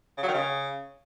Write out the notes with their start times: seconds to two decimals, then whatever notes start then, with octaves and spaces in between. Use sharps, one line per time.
0.18 C#3
0.23 F#3
0.28 D#3
0.34 C#3